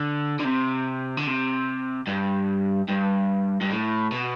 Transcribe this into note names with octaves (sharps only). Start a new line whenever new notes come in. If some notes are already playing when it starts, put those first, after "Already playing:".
Already playing: D3
D3
C3
D3
C3
G2
G2
G2
A2
B2